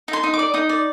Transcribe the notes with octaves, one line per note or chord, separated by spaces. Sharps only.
D#4
C6
D#4
D6
D5
D#4 D#6
D5